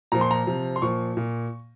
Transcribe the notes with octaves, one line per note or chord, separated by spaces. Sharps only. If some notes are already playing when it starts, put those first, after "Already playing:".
A#2 F3 A#5
C6
A#5
C3 F3
C6
A#2 F3 C#6
A#2